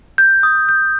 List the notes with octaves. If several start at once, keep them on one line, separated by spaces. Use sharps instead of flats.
G6
D#6
G6